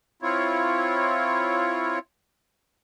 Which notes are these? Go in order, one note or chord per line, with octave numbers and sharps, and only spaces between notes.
C4 E4 F4 C#5